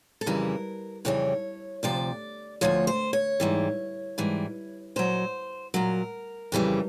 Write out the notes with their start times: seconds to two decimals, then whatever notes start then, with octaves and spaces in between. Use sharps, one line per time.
0.21 A4
0.26 F2 C#3 E3 G3 A#4
1.05 F2 C#3 E3 G3 C#5
1.83 D2 C3 F3 D5
2.61 D2 C3 F3 C#5
2.87 C5
3.13 C#5
3.40 G#2 E3 G3
4.18 G#2 E3 G3
4.96 A#2 F#3 C5
5.74 A#2 F#3 A#4
6.52 F2 C#3 E3 G3